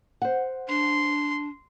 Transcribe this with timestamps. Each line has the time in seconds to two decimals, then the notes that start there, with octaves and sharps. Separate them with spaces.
0.22 C5 F#5
0.68 D4 C6